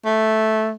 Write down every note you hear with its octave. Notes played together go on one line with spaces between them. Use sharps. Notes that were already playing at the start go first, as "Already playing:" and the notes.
A3